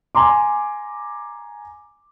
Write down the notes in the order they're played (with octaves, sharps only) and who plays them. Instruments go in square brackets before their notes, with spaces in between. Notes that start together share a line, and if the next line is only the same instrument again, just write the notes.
[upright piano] G#5 A#5 C6 D6